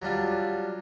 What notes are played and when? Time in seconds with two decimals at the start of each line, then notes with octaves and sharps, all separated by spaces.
0.02 F#3 G3 D4 F4